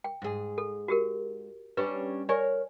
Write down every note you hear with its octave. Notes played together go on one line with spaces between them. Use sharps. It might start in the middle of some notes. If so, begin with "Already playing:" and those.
G5
G#2 G#4
A4
F#4 G4 A#4
G3 C#4 D4 B4
A#4 C#5 D5 G#5